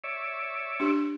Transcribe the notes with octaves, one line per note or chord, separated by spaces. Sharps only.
C#5 D5 E5
D4 G4